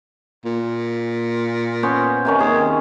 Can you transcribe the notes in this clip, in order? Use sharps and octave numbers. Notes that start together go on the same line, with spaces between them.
A#2
B3 C#4 C5
C3 D#3 C#4
D#2 G#4